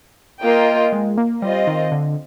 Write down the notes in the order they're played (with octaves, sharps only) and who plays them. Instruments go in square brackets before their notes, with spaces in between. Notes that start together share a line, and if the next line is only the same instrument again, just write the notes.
[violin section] A#3 F4 A#4 D#5 G5
[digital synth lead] G#3
A#3
[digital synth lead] G3 [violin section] C4 F4 C5 D#5
[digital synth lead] D#3
D3